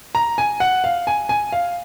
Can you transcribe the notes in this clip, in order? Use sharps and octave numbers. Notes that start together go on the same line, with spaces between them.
A#5
G#5
F#5
F5
G#5
G#5
F5